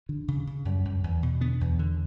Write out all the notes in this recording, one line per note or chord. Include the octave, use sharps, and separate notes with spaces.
D3
C#3
C#3
F#2 G3
F#2
E2
B2
D3 B3
E2
D3